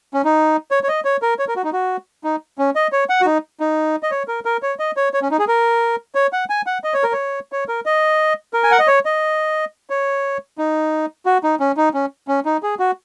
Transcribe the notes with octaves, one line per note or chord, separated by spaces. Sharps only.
C#4
D#4
C#5
C#5
D#5
C#5
A#4
C#5
A#4
F#4
D#4
F#4
D#4
C#4
D#5
C#5
F#5
F#4
D#4
D#4
D#5
C#5
A#4
A#4
C#5
D#5
C#5
C#5
C#4
D#4
G#4
A#4
C#5
F#5
G#5
F#5
D#5
C#5
A#4
C#5
C#5
A#4
D#5
A#4
G#5
F#5
D#5
C#5
D#5
C#5
D#4
F#4
D#4
C#4
D#4
C#4
C#4
D#4
G#4
F#4